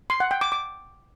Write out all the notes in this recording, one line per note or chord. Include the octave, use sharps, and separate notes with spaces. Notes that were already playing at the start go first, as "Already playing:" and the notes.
C6
F#5
G5
D6
D6